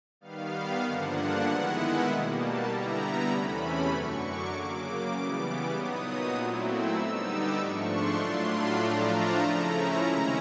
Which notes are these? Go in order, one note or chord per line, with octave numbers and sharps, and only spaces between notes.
D#3 G3 B3 F5
G2 D3 F3 A#3 D4 F#5
D#3 G#3 B3 E4
B2 G3 A#3
A5
D3 G3 B3 E4 A#5
E2 C3 E3 A3 C#4 B5
F#2 D3 F#3 C#6
D6
C#3 F#3 A#3 D6
C#3 E3 G3 B3
A#2 F#3 B3 D#4 D#6
A#2 F#3 A3 C4 E4
E6
D3 G3 B3 D#4 E6
D6
G#2 F3 A3 D4 C#6
C6
A2 F#3 A3 D4 F4 C6
B5
A2 F3 A3 D4 F4 A#5
A5
C#3 F3 A3 C#4 E4 A#5
C3 D#3 G#3 C#4 E4